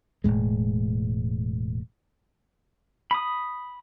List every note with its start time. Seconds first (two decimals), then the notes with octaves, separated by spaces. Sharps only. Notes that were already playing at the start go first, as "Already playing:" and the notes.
0.24 E1 C#2 A2 G#3
3.11 B5 D#6